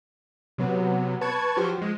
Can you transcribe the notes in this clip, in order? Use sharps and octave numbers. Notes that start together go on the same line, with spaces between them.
C3 F#3 B3
B4 A5 C#6 G#6
F3 F#3 F#4 G4 C5
F3 G#3